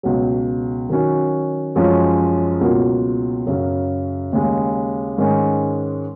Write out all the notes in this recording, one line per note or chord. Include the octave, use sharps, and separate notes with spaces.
C#2 B2 F#3
D#3 F#3 C#4 F#4
F#2 F3 G#3 C#4
C#2 B2 F#3 A#3 F4
F#2 C#3 F#3
D#2 C#3 G#3
G#2 D#3 G#3 C#4